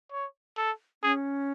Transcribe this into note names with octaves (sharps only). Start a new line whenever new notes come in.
C#5
A4
C#4 G#4